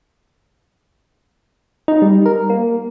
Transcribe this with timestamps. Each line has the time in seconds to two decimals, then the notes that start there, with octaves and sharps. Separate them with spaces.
1.88 D#4
2.02 G3
2.26 A#4
2.50 A#3